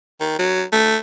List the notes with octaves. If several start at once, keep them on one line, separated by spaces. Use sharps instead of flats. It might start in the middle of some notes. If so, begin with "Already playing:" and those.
D#3
F#3
A3